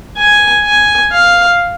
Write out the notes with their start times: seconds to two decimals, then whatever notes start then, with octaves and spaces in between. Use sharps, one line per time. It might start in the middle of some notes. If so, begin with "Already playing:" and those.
0.18 G#5
0.65 G#5
1.12 F5